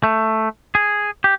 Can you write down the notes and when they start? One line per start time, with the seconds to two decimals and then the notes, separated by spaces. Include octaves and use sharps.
0.04 A3
0.75 G#4
1.24 G4